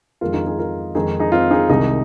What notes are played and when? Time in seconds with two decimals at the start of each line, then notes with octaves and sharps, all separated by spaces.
0.21 F2 D#3 G#3 F4 A#4
0.33 D#4 G#4
0.46 D#4 G#4
0.59 F4 A#4
0.95 F2 D#3 G#3 D#4 G#4
1.19 D#4 G#4
1.32 C4 F4
1.51 D#4 G#4
1.69 C2 C3 D#3 G#3 D#4